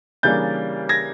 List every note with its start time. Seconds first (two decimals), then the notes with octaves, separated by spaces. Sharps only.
0.23 C#3 E3 G3 A#3 D4 G6 A6
0.89 G#6 A#6